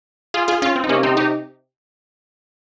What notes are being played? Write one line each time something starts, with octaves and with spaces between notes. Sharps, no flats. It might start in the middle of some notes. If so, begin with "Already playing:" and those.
F4 G#4
F4 G#4
C#4 F4
C4
D#4
C3 A#3 C#4
C4 D#4
D#4 G4